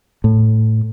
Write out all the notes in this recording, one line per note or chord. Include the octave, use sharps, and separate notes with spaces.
A2